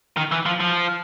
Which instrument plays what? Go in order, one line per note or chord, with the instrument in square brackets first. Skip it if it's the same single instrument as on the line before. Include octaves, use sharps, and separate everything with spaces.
[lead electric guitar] D#3
E3
F3
F3